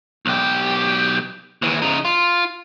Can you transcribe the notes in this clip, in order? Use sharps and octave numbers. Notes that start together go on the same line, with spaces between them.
B1 G4
D#2 E3
C#3 D#4
F4